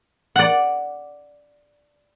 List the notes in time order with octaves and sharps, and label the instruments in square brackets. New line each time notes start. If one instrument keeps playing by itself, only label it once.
[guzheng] D5 F#5